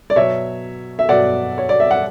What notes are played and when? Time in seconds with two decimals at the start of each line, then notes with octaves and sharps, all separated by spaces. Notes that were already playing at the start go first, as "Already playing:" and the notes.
0.10 D5
0.16 B2 F#3 C#5 E5
0.99 E5
1.09 B2 F#3 D5 F#5
1.58 C#5
1.69 D5
1.80 E5
1.91 F#5